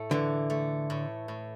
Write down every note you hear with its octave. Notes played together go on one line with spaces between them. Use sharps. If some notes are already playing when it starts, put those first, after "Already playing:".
Already playing: A2 A3
D3 E3
A3
A2
A2